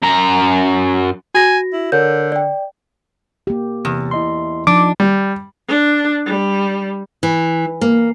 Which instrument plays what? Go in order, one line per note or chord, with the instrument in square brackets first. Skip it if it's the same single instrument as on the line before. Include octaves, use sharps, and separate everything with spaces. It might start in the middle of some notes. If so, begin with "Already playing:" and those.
[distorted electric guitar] F#2 A#5
[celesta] F#4 A#6 [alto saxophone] G#5
[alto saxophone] E4
[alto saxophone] D3 [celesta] A#4 C#5 G6
[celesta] D5 G5
[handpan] A#3 G4
[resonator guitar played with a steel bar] E2 [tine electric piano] C3
[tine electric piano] E4 D#5 C6
[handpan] F3 D#4 [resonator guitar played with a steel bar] D4 [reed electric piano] D6
[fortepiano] G3
[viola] D4
G3
[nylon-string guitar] E3
A#3